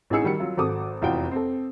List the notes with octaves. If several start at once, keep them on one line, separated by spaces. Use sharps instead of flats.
A1 E3 D#4 G#4 E6 C#7
D#3 G3 F#4 C#7
F#3 F4
G#1 F#4 A4 D6 D#6
F1 E2 F4 F#4 G5
C4 A4